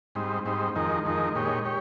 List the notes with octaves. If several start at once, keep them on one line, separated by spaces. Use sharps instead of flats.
G#2 G3 C4 D#4
G#2 G3 C4 D#4
F2 D#3 G#3 D#4 A#4
F2 D#3 G#3 D#4 A#4
A#2 G#3 D#4 G4 C#5
G4 C#5